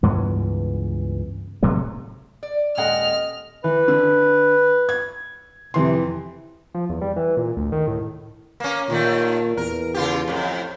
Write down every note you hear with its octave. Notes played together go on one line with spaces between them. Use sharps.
C#2 G2 E3 B3
A2 C3 F#3 A3
D5
D#1 G#3 D#5 F#5 F6
E3 B4
D3
G#6
F2 C3 E3 C6
F3
E2
G3
E3
A#2
D2
D#3
A2
A#3 C#4
D#2 A#2 D#3 A3
E2 A#4
C#3 F4 G4
F2 A2